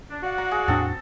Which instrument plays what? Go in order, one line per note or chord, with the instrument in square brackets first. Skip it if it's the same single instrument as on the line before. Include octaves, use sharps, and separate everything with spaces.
[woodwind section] D4
[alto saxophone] F#4 [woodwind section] D5 F5 F#5
[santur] A#5
G#4
[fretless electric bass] E2 A2 D4 [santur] C4 A4